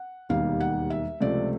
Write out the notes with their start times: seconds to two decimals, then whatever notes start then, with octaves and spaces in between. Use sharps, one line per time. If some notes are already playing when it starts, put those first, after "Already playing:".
Already playing: F#5
0.29 E1 D#2 D#3 G3 F5
0.60 F#5
0.90 E5
1.20 C#2 C3 F3 A3 D5